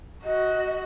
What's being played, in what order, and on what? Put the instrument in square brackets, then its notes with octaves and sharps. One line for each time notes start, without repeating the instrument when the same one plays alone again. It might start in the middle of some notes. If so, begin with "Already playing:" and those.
[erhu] F#4 [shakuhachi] D#5